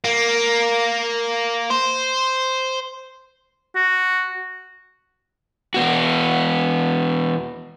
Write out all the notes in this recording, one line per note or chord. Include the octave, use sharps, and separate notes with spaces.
A#3
C5
F#4
E2 B3 F#4